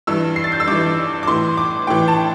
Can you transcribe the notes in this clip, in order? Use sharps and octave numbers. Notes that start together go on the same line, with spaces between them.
G2 E3 E6
C7
A6
G6
E6
G2 E3 D6
D6
A2 E3 C6
D6
A2 E3 G5
A5